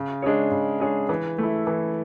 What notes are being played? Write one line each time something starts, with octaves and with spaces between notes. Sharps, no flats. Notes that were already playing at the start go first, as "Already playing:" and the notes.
Already playing: C#3
G#3 D4 G#4 C#5
C#3
G#3 D4 G#4 C#5
E3
A3 E4
E3